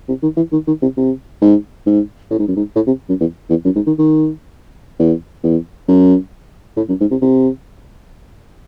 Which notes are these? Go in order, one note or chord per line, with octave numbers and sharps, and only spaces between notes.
C3
D#3
E3
D#3
D#3
C3
C3
G#2
G#2
A2
G#2
F#2
G#2
A2
C3
F#2
E2
E2
F#2
G#2
D#3
D#3
E2
E2
F#2
A2
F#2
G#2
C3
C3